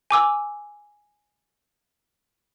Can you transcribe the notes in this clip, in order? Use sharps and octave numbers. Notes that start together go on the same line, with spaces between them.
G#5 D6 E6